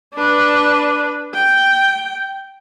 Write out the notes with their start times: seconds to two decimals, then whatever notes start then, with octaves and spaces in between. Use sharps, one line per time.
0.14 D4 B4
1.34 G5